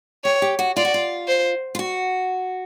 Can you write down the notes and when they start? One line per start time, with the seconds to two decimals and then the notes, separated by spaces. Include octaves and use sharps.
0.24 G4 C#5
0.42 G4
0.59 F#4
0.76 F4 D5
0.85 F#4
0.94 F4
1.28 C5
1.75 F4
1.79 F#4